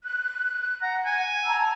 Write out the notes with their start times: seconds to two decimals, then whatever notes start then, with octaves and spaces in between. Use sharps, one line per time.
0.04 F#6
0.82 F#5 A#5
1.06 G#5
1.46 A5 A#5 E6